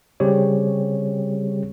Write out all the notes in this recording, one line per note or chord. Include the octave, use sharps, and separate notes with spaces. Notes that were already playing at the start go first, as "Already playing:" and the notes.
C#3 G3 C4 G4 G#4 C#5